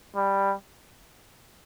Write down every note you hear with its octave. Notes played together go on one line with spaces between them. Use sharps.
G3